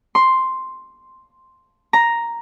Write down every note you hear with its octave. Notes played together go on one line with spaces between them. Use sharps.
C6
A#5